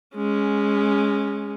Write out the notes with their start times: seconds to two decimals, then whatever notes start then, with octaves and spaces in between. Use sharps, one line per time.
0.16 G#3 C#4